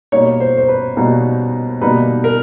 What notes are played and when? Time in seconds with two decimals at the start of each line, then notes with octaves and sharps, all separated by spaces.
0.12 B2 G3 A#3 D#4 C#5
0.40 C5
0.57 C5
0.68 B4
0.97 B2 G3 A#3 D#4
1.81 B2 G3 A#3 D#4 B4
2.24 A#4